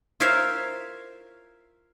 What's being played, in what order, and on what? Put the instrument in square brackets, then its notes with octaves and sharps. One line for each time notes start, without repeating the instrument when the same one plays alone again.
[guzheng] F4 A#4 C5 C#5 E5 F5